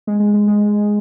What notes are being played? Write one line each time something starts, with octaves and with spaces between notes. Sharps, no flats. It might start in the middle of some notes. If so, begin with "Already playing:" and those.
G#3
G#3
G#3
G#3